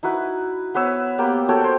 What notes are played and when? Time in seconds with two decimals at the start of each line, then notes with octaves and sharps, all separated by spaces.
0.03 D#4 E4 F#4 B4
0.74 B3 B4 C#5 E6
1.18 A#3 B3 G4 G5
1.49 F#4 A4 C#5 G5
1.61 C5 G5